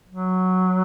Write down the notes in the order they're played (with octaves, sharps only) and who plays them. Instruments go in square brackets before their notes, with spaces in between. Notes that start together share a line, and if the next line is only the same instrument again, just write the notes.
[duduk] F#3